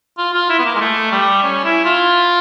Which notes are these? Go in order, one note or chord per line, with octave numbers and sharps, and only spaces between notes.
F4
F4
E4
B3
A#3
G#3
A3
G3
C#4
E4
F4